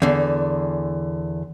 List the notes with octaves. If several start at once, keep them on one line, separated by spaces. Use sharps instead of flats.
E2 D3